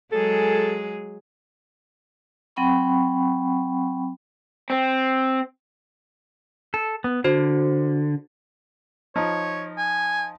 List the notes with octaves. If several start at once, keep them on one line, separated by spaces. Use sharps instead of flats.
F#3 G#3 G#4 A4
F#3 C4 F#5 G5 B5 C#6
C4
A4
B3
D3 F#4 C5
F3 D#4 C#5
G#5